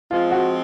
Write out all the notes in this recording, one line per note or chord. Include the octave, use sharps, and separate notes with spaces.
F3 G#3 C4 F4
F#4